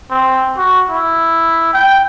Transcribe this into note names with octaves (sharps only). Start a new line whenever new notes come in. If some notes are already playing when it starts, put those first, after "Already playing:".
C4
F#4
E4
G5